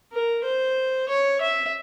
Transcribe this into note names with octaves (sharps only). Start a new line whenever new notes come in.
A#4
C5
C#5
E5